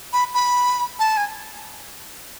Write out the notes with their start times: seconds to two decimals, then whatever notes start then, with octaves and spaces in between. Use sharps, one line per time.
0.13 B5
0.34 B5
0.99 A5
1.17 G#5